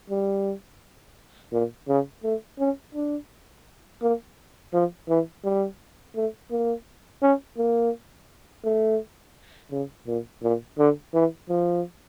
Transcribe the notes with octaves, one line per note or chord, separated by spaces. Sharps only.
G3
A#2
C#3
A3
C#4
D4
A#3
F3
E3
G3
A3
A#3
C#4
A#3
A3
C#3
A#2
A#2
D3
E3
F3